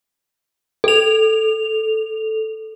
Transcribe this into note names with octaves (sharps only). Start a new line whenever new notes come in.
A4 F7